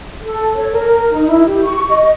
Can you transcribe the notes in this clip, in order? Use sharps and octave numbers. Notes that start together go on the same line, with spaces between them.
A4
C#5
A#4
D#4
E4
G4
C#6
D#5